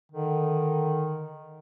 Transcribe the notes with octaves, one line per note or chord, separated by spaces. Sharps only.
D3 D#3